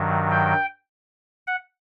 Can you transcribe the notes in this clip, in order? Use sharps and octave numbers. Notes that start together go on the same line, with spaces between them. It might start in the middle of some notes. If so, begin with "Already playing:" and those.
Already playing: G2 D#3 F#3
G5
F#5